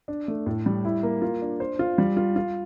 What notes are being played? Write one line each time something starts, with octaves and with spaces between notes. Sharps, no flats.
D4
A3
A2
G3
E4
A#3
F4
D4
C5
F4
G3
F4
F4